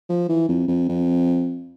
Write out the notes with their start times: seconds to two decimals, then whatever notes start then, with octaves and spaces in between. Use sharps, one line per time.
0.10 F3
0.29 E3
0.49 F2
0.68 F2
0.89 F2